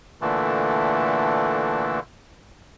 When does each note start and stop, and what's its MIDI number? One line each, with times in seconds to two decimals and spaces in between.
0.21 2.00 46
0.21 2.00 50
0.21 2.00 52
0.21 2.00 57